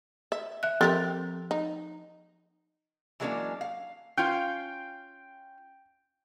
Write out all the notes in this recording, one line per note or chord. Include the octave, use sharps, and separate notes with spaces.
E5
E5 F#6
F3 C4 G4 A4 A#4 A6
D#4
E3 F#3 G#3 A#3 C#4 D4
F5
C#4 F4 F5 G5